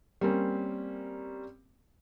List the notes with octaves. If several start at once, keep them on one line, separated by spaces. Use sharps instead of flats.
G3 A#3 C4 C#4